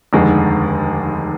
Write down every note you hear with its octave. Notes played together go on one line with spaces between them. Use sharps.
F1 D#2 D3 G#3